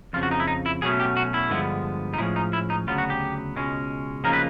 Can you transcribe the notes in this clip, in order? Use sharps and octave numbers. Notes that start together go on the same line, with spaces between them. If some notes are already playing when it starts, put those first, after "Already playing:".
F2 C#3 F3 F4
F#4
D#4
E4
D#4
E4
B2 F#3 A3 C#4 G#4
G4
F#4
E4
G2 D3 F3 G#3 B3
D#4
A2 F3 G#3 C#4 E4
D#4
E4
D#4
D2 C#3 F#3 B3 F4
F#4
G4
C#2 B2 G#3 C#4
C#3 F3 A#3 D#4 A#4
B4